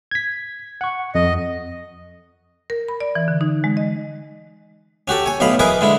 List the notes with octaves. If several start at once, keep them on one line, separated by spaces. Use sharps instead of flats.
G#6 B6
F#5 C#6
F2 D#5
A#4
B5
D5
E3
D3
D#4
G#3
D#5
C#4 F#4 G4 A4
C#5 G#5
B1 A2 D#5 F5 B5 C6
E3 G#4 A#4 B4 D#5 G#5
D3 G#3 E4